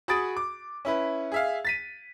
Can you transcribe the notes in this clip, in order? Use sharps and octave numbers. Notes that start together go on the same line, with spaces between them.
F#4 G#4 B5 D#6 A6 D7
D6
C#4 E4 B4
G#4 E5 F5
A6 B6 D#7